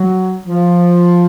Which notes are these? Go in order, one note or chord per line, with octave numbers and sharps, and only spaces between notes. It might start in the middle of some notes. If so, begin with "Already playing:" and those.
Already playing: F#3
F3